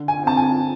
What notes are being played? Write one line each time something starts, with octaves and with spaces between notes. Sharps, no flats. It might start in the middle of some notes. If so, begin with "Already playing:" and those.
Already playing: D3
G#5
C4 A5
G#5